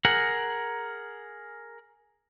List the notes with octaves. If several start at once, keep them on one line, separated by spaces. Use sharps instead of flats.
G#4 A#4 F#5